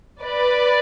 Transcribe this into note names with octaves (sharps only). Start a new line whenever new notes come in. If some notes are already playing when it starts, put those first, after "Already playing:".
B4 D5